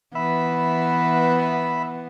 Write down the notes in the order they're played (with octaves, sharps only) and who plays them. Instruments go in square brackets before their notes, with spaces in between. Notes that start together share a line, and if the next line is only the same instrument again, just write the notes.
[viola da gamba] E3 [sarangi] B3 [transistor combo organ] E5 B5